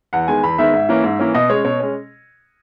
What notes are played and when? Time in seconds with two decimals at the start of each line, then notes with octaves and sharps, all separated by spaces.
0.13 E2 F#5
0.28 D#3 G#3 B3 G#5
0.43 E2 B5
0.58 D#3 G#3 B3 E5
0.74 G#2
0.89 E3 A#3 C#4
1.04 G#2
1.19 E3 A#3 C#4
1.34 B2 D#5
1.50 G#3 C#4 C#5
1.64 B2 C#5
1.80 G#3 C#4